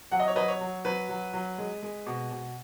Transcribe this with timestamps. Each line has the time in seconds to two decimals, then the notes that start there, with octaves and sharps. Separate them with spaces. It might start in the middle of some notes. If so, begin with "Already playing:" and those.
0.12 F#3 F#5
0.20 D#5
0.28 C#5
0.36 F#3 B4 D#5
0.48 C#5
0.61 F#3
0.85 F#3 B4
1.09 F#3
1.33 F#3
1.58 G#3
1.83 G#3
2.06 B2
2.31 B2